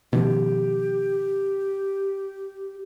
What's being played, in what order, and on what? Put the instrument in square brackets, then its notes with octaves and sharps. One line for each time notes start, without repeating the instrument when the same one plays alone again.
[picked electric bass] B2 D#3 F3 [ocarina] G4